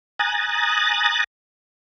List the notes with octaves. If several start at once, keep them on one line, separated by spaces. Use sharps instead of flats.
G#5 A#5 D#6 F#6 A6